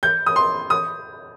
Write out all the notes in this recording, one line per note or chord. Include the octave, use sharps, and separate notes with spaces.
G6
D#6
C6
D#6